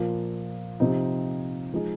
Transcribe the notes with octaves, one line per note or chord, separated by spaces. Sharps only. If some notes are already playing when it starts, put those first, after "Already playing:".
Already playing: A#2 F3 A#3
C3 F3 C4 D#4
F3 G#3 D#4 G#4